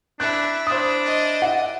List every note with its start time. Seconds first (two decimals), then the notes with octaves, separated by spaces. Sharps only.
0.20 D4 E4 F#6
0.67 D4 C5 D#6
1.06 D5 D#5
1.42 E4 F#5